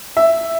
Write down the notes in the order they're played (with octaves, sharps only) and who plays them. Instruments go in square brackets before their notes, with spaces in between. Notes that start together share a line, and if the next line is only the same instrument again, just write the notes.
[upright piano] E5